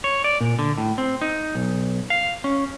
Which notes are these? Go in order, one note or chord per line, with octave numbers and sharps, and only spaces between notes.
C#5
D5
A#2
D3
A2
C4
D#4
B1
F5
C#4